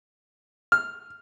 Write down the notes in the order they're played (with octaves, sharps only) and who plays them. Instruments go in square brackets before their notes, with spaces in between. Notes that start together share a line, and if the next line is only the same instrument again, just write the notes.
[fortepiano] F6